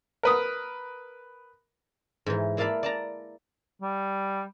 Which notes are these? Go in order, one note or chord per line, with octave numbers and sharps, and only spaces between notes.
A#4 B4 D#6
G#2 E3
A#3 E4 D5 F5 A5 B5
D5 A5 A#5
G3